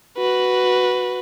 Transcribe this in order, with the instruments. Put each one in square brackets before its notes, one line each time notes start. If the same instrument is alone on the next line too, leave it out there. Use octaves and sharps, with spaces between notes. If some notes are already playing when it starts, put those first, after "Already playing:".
[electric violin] F#4 B4